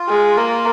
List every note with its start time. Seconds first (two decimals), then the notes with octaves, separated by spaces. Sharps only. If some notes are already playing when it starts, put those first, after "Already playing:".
Already playing: F4
0.09 G#3
0.38 A#3